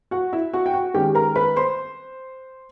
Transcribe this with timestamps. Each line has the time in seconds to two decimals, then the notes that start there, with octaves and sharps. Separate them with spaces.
0.11 F#4 F#5
0.33 E4 E5
0.53 F#4 F#5
0.66 G5
0.74 F#4 F#5
0.94 D#3 G#3 C#4 G4 G5
1.15 A#4 A#5
1.36 B4 B5
1.56 C5 C6